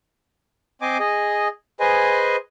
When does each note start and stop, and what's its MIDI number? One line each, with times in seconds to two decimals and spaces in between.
0.82 0.97 60
0.82 0.97 72
0.82 0.97 75
0.82 0.97 80
0.82 0.97 86
1.00 1.48 68
1.00 1.48 75
1.80 2.36 68
1.80 2.36 71
1.80 2.36 72
1.80 2.36 75
1.80 2.36 80